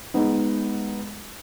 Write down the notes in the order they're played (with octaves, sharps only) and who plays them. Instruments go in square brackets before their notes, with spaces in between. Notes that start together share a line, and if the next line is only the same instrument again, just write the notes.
[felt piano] G#3 B3 D#4